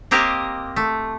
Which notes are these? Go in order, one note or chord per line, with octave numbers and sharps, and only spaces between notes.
A#3 C4 G4 A#4 D#5
A3